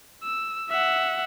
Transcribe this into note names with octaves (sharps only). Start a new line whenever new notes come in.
E6
E5 F#5